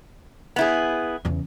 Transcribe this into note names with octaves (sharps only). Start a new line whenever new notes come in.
B3 E4 G#4
E2 C#3